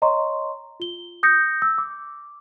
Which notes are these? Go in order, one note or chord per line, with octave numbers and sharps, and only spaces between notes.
C#5 D#5 A#5 C6 C#6
F4 G7
D#6 G6 A#6 C#7
E6
D6